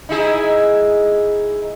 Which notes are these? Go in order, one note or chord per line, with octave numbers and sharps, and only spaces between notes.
D#4 E4 G#4